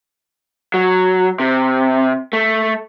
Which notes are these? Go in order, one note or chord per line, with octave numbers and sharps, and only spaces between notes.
F#3
C3
A3